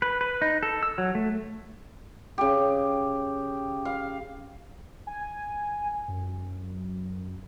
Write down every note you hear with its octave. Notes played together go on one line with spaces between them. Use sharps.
B4
B4
D#4
A4
E6
F#3
A3
C#3 G4
F5
G#5
F#2